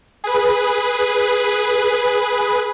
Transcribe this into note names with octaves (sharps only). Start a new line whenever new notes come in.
G#4 B4